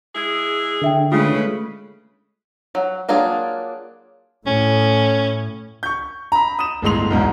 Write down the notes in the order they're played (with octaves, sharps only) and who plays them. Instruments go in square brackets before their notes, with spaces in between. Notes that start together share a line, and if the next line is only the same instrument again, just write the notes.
[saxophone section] G#3 E4 G#4
[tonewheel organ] D3 [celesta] A4 E5 G5
[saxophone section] C#3 [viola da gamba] G#3 A3 B4 [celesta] F4 D#6
[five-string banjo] F#3
F#3 A#3 D4 F4 G#4
[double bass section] A2 [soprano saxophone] C#4
[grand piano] C#6 G6
A#5 B5
D#6 E7
G1 A2 G#3 C6 F7
B1 E2 G#2